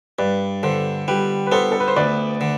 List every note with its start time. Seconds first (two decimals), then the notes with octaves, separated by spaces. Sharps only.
0.19 G2 B4 D5
0.63 D3 A4 C5
1.08 G3 G4 B4
1.47 B4
1.52 B3 A4 C5
1.72 A4
1.80 B4
1.88 C5
1.96 D2 B4 D5
2.41 D3